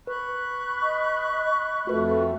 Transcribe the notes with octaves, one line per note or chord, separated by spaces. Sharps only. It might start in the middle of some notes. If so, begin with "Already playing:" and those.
B4 B5 C#6 F#6
D#5
F2 A3 F4 F#4 B4